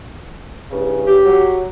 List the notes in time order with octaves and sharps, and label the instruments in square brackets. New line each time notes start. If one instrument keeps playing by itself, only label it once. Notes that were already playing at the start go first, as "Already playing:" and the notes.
[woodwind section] E2 G2 C#3
[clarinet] G4
[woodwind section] F#3